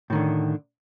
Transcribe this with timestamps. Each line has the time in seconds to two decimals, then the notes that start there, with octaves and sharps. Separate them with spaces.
0.10 A2
0.12 D#3
0.15 D3